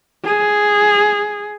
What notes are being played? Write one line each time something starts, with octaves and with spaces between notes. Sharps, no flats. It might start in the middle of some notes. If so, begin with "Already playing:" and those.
G#4